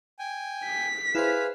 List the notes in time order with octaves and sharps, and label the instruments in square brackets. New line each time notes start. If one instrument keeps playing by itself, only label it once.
[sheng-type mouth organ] G5 G#5
[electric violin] B6
[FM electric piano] E4 C5 [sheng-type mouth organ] G#4 B4 F5